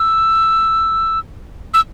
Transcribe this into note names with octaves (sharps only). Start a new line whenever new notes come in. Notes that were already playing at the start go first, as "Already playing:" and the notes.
Already playing: E6
E6